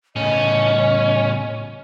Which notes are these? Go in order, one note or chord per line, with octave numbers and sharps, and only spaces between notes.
A2 C#3 C#4 D#5